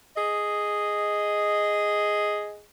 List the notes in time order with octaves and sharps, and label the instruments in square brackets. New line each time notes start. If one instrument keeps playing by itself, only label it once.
[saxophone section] G#4 D#5